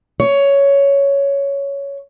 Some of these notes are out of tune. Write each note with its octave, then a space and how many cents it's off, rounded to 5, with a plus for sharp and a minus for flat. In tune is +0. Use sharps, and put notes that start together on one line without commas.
C#5 +10